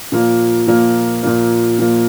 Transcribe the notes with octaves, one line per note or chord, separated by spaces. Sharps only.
A#2 F3 A#3
A#2 F3 A#3
A#2 F3 A#3
A#2 F3 A#3